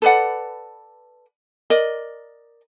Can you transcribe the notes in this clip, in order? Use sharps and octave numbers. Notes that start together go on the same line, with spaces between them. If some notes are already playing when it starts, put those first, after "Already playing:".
A4 B4 D5 F#5
A#4 D5 D#5